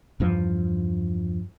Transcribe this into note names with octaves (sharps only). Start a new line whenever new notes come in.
E2 G2 F3